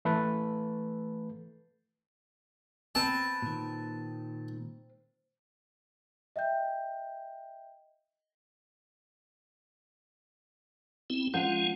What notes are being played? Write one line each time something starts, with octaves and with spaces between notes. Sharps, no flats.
E3 A3 A4 B4
C4 B4 A5
A#2 D#3
D#5 E5 G5 G6
C4 E4
F3 G#3 C#4 F#5 G6